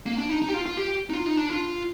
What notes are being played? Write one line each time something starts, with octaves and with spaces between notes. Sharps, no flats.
A#3
D4
D#4
D#4
G4
F4
F4
G4
D#4
F4
D#4
D4
F4